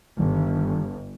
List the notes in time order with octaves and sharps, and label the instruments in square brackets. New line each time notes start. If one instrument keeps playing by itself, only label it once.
[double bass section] G1 [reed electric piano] D#3 G3